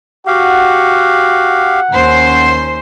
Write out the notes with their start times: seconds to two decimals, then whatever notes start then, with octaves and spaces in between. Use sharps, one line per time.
0.27 F#4 G4 F5 F#5
1.93 D#2 C#4 C5